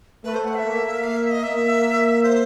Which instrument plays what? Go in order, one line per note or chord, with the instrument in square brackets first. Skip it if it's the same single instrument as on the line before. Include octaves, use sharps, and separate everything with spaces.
[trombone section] A3 [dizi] B4
[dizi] C5
F#5
E5
[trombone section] A#3
[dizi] F5
E5
D#5
[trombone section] A#3 [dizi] E5
[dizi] C5